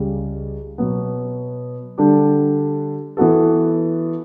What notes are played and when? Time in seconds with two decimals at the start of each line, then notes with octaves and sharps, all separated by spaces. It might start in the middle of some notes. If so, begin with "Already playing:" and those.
Already playing: C#2 C#3 G3
0.78 B2 F#3 B3
1.98 D3 G3 D4 G4
3.17 E3 B3 F#4 A4